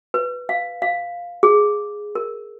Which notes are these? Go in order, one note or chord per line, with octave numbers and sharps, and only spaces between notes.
B4
F5
F5
G#4
A#4